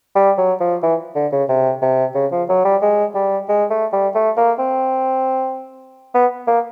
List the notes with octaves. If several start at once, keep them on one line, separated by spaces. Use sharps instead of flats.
G3
F#3
F3
E3
D3
C#3
C3
C3
C#3
F3
F#3
G3
G#3
G3
G#3
A3
G3
A3
A#3
C4
B3
A#3